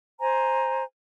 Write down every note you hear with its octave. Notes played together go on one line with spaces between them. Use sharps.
C5 G#5 A#5